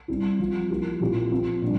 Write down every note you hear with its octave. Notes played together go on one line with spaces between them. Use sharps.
G3 C4 E4
F3 C4 F4
F3 A#3 E4 G4
A#2 F3 C4 E4 G4
F3 C4 F4
A#2 G3 D4